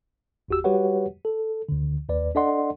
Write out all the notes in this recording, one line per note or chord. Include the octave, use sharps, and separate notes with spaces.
G1 E2 F#4 G4 E6
G3 F#4 G4 B4 C#5 F#5
A4
D2 D3
D#2 B4 D5
D4 A4 D5 D#5 F#5 C6